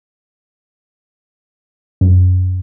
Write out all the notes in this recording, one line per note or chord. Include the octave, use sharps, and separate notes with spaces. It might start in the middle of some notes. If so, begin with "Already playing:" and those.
F#2